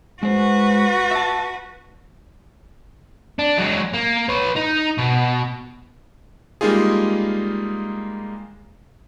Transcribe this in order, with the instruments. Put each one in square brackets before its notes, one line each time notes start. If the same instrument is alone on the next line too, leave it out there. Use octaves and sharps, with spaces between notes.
[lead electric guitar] G#3 C5 [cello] F#4 B4
[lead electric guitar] E5 A5
[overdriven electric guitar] D4
F#3 G#3
A#3
B4 C#5
D#4
B2
[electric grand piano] G3 G#3 A#3 D#4 F4 G#4